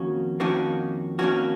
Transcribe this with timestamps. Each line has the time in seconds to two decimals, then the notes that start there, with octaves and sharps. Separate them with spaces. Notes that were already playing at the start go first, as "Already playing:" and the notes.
Already playing: F2 D#3 A#3 C#4 F#4
0.40 F2 D#3 A#3 C#4 F#4
1.19 F2 D#3 A#3 C#4 F#4